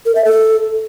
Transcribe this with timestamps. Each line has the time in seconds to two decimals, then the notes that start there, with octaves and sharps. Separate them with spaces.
0.06 A#4
0.15 E5
0.25 A4